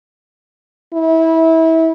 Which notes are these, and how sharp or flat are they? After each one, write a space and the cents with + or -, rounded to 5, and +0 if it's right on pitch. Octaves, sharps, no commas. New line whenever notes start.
E4 -25